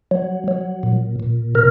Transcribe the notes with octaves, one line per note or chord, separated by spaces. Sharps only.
F#3
F#3
A#2
A#2
C3 A#4